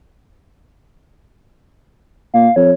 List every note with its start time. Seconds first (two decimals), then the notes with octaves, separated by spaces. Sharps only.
2.34 A#2 F5
2.56 F2 C#5